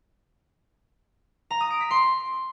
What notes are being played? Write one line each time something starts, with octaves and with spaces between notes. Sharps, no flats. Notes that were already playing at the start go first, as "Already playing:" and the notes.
A#5
D#6
D7
B6
C6